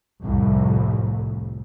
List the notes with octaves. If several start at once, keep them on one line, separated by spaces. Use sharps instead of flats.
C2 F2 A2